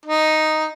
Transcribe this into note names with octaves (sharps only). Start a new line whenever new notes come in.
D#4